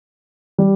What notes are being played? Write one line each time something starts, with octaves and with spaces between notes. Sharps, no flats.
G3